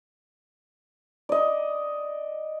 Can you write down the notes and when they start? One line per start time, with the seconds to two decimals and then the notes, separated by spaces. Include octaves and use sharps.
1.29 D5 D#5